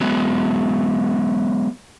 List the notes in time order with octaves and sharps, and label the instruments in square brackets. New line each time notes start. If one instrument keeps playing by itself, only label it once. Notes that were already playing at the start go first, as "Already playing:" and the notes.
[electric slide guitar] F#3 G#3 B3